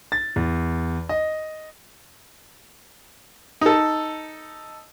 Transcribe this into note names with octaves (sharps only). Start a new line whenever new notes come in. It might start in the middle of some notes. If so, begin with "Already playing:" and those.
A6
E2
D#5
D#4 A4